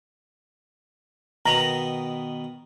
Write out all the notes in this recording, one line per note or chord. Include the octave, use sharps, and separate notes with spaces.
B2 D#3 A#5 B5